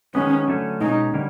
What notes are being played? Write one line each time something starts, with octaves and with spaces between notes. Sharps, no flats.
D#3 G#3 B3 C#4
D3 F#3 A3 C#4
B2 G#3 C#4 D#4
D3 G3 A#3 C#4